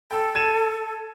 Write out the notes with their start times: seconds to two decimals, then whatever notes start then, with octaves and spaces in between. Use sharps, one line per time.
0.11 A4 G5 E6
0.35 G#6 D#7 E7